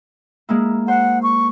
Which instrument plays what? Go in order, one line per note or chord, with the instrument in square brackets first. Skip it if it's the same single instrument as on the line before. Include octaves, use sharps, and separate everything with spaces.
[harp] G#3 A#3 E4
[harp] C5 [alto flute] F#5
[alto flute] C#6